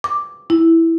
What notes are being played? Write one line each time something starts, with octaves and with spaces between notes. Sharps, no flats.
D6
E4